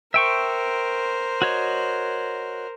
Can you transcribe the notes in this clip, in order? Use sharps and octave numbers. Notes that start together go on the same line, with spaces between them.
A#4 C5 E5 G5 C#6
F#4 C#5 D#5